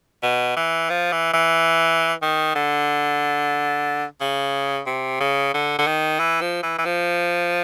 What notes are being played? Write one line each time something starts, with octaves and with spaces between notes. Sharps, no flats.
B2
E3
F3
E3
E3
D#3
D3
C#3
C3
C#3
D3
D3
D#3
E3
F3
E3
E3
F3